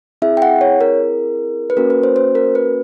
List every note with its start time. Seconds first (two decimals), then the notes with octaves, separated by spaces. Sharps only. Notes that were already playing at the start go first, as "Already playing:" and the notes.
0.22 C4 E4 G#4 E5
0.37 G5
0.42 F#5
0.61 C#5
0.81 A#4
1.70 B4
1.77 A#3 C#4 F#4 A#4
1.90 B4
2.03 C5
2.16 C5
2.35 A#4
2.55 B4